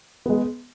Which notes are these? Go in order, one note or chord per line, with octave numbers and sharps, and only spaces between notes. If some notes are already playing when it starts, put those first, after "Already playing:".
G#3 B3